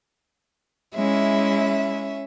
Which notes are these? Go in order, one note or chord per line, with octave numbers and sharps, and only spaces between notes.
G#3 C#4 E4 E5